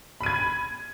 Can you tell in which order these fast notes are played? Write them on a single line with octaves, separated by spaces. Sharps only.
B5 D#7 G#6